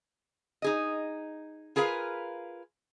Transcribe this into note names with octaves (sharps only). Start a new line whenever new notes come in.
D#4 G#4 D#5
F4 G#4 A#4 B4 F5